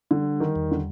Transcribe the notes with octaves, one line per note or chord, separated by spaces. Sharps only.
D3 G3
D#3
E2
D3